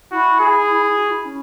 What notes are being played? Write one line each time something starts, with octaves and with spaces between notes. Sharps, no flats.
E4 F#4
G#4
F#4
E4
C#4